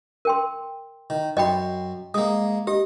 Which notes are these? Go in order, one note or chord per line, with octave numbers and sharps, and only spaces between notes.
A#4 G5 C6
D#3
F#2 D#5 G5 B5 C6
G#3 A#3 D#6
G4 D#5